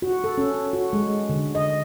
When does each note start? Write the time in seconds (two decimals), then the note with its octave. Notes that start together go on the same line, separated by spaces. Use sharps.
0.02 F#4
0.24 A4
0.38 C#4
0.73 F#4
0.93 G#3
1.29 D3
1.55 D#5